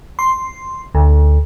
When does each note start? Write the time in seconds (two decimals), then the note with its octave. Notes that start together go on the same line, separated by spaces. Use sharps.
0.19 C6
0.95 D2